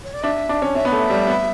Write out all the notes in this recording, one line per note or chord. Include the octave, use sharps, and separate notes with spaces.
C#5
D5
D4 E5
D4
C#4
C#4 E5
B3 D5
A3
E5
G3
B3